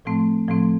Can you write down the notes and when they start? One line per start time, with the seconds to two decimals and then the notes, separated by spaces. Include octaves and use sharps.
0.05 A2 F3 A3 C4
0.48 A2 F3 A3 C4